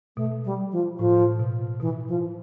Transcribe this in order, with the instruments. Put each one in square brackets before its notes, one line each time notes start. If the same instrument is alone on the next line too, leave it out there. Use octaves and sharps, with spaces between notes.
[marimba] B2 [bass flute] A3
[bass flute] G3
F3
[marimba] A2 [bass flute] F3
[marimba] B2
[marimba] B2 [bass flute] E3
[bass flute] F3